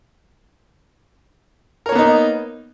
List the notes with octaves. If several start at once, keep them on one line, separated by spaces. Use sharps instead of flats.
A#3 B3 D#4 A#4 C#5